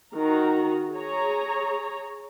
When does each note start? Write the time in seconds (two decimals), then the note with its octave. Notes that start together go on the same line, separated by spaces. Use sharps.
0.14 D#3 F#4 A#5
0.92 G#4 C#5 A#5